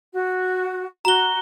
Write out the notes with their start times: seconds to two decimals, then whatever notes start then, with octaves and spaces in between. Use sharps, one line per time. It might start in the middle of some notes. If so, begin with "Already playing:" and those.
0.13 F#4
1.05 F#4 A#5 G7